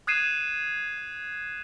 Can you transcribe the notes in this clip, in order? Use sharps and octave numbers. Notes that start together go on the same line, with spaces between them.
D#6 F#6 G#6 C7 D#7 E7